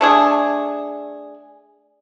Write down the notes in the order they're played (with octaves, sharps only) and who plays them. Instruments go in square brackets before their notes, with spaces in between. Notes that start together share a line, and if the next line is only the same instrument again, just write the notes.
[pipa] A3 D4 G#4